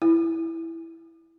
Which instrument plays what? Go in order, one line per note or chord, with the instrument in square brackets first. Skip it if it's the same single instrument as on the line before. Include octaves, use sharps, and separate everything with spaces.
[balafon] E4